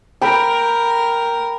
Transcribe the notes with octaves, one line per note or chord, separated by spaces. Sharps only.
A#4 G5 B5